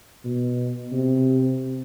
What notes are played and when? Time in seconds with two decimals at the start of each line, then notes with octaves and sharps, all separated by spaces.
0.25 B2
0.92 C3